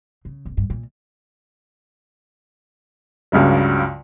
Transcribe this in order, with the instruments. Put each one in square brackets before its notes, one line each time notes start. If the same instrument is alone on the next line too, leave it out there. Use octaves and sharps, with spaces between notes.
[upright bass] C#3
D1
G2
A#2
[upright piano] C#2 G2 C#3 F#3